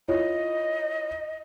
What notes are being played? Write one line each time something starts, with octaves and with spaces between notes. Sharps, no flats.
E4 F4 C#5 D#5